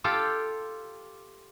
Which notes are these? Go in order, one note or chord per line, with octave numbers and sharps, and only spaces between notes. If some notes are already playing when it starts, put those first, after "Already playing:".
F4 G4 A4 F5 G5